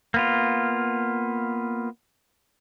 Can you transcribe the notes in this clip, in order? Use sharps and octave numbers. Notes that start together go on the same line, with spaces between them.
A#3 B3 F4